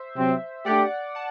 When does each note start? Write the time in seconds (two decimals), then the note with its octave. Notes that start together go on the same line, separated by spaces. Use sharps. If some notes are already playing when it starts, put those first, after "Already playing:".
Already playing: C5 E5
0.16 C3 F#3 C4
0.66 A3 D4 G4 D5 F#5
1.15 F#5 A5